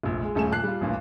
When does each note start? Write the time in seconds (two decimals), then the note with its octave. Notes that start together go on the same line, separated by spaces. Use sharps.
0.03 F1 A#1
0.22 G#3
0.35 D#1 C#3 A3 A4 G#5 E7
0.52 A#2 A5 F#6 C7 F#7
0.63 G3 F4
0.81 A1 D2 G2 A#2